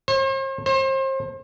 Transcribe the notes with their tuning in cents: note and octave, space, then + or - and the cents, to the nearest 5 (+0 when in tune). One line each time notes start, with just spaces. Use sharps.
C5 +45
C5 +35